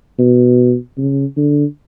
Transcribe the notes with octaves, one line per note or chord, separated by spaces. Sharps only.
B2
C#3
D3